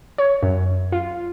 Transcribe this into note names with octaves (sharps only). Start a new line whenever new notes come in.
C#5
F#2
F4